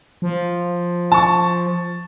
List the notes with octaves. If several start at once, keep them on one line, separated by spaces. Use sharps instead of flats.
F3
A5 C#6